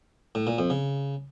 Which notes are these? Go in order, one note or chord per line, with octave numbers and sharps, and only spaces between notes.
A2
A#2
F2
C#3